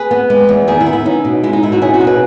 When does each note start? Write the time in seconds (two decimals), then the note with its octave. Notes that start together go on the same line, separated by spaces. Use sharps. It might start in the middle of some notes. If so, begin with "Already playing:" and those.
Already playing: G#4 B4
0.11 B3
0.30 G#3
0.49 E2
0.68 D#3 E4 G#4
0.80 E4
0.86 B3
0.93 E4
1.05 C#4 D#4
1.25 B2
1.43 G#3 E4
1.53 D#4
1.63 B2 E4
1.72 D#4 F#4
1.81 C#4 E4 G#4
1.94 D#4 F#4
2.01 B2
2.07 G#4 B4